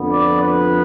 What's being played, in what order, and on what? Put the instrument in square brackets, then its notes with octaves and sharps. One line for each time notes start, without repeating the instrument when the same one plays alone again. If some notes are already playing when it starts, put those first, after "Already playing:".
Already playing: [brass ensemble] F2 D3 F3 B3
D5
B4